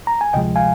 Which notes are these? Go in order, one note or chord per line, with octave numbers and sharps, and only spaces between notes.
A#5
G#5
D2 C3 F3 G#3 D#5 G5
F5 G#5